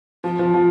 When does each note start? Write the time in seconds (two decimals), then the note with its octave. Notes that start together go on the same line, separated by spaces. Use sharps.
0.24 F3 F4
0.39 F3
0.54 F3